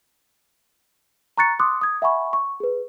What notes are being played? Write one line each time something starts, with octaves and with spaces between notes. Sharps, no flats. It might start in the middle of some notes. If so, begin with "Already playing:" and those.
A#5 C#6 F#6 A6 C#7
C6 D6 D#6 F#6
D#6 G#6
E5 F#5 G#5 B5 C#6
C#6
G#4 B4